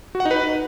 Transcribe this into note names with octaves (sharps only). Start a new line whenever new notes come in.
F#4
F#5
D#4
B4